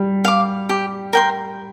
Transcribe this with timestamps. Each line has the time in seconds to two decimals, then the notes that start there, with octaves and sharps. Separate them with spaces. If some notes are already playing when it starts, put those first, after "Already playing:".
Already playing: G3
0.25 F5 D6
0.69 G4
1.13 A#4 G5 C6